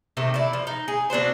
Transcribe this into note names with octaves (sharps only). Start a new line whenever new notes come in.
C3 D#3 A3
E4 D5
F3
D#4
G#4
C4 D4 F#4 C5